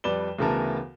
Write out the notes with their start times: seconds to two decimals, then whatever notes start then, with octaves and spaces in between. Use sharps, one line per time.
0.04 F2 G3 B4 D5 E7 G7
0.39 D2 C#3 E3 B3 A#4 A5